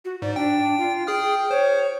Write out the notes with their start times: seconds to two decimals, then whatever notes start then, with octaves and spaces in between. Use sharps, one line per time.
0.05 F#4
0.22 G#2 D5
0.36 D4 G5
0.78 F4
1.07 G#4 G5 D#6 F6
1.51 C5 C#5